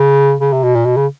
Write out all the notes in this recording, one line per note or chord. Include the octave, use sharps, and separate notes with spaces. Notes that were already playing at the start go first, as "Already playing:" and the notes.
Already playing: C#3
C#3
C3
B2
A#2
B2
C#3